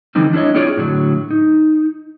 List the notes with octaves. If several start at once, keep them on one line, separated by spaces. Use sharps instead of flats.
D3 E3 G3 C4 D#4
D4 E4 G4 C#5 D#5
C4 E4 F4 G#4 C#5 D5
A2 D3 F#3
D#4